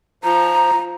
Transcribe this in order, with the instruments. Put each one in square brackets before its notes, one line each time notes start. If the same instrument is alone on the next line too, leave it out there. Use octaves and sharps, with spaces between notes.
[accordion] F3 [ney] A#5